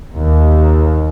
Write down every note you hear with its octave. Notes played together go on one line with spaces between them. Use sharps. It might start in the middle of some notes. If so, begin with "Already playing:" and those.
D#2